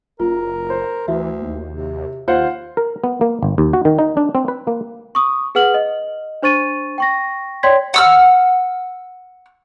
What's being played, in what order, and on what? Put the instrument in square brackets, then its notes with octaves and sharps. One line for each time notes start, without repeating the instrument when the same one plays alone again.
[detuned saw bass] F#1 [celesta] F4 [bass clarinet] A#4
[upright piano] C5
[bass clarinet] D2 [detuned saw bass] E3 [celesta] E4 F#4 E5
[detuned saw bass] D#2
[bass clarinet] C3
[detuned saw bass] D#2 [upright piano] F4 C5 F#5
[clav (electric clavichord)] A#4
B3
A#3
G1
D#2
F#4
D#3
D#4
D4
C4
B4
A#3
[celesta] C#6 D#6
G#4 B4 F#5 F6 F#7
D#5
D4 C5 C#6 A6 D#7
G5 C#6 A#6
C#5 D5 G5 C6 G#6 B6
[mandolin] F#5 E6 F6